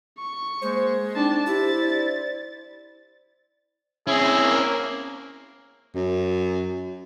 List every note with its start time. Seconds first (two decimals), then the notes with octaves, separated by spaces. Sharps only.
0.18 C#6
0.62 G#3 A#3 C5
1.15 C4 D4 D#4 A5
1.46 E4 G4 C5 A6
1.81 D5
4.07 C4 C#4 E4 G#4
4.43 A#3
5.95 F#2